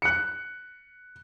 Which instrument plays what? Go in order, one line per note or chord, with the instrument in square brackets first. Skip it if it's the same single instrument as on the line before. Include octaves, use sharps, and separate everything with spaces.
[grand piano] F#6 C#7